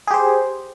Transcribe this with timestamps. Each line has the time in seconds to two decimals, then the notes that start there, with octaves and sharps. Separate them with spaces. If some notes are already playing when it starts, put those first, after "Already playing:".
0.07 G#4
0.11 G4
0.14 C5